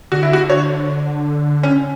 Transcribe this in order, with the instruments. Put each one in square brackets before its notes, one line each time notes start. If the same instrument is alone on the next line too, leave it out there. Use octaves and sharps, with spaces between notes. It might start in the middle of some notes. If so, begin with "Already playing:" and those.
[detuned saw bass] D3 [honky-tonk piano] F#4
[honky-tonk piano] E4
F#4
C#5
C#4